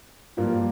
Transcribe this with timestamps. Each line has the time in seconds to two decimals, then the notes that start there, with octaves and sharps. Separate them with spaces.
0.37 G2 F3 A#3 F4